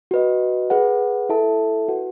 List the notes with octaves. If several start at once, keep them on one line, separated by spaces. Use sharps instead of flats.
F#4 B4 D#5
G#4 B4 F#5
E4 A4 E5 A5
F#4 B4 F#5